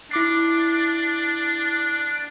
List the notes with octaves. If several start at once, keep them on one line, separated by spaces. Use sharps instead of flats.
D4 E4 D6 C7